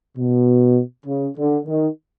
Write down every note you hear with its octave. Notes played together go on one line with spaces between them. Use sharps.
B2
C#3
D3
D#3